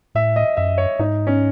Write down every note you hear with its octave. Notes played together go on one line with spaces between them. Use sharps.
A2 E5
D#5
F#2 E5
C#5
G#2 D#4
C#4